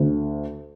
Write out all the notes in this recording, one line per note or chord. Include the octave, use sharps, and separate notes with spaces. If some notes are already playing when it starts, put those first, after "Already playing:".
Already playing: D2